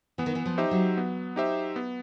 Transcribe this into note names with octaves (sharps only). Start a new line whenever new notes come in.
E3 B3
D#3
E3
F3
D#4 G4 C5 E5
F#3
B3
D#4 G4 C5 E5
B3